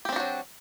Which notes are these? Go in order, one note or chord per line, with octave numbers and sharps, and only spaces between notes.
F#3 C4 D4 F#4 G4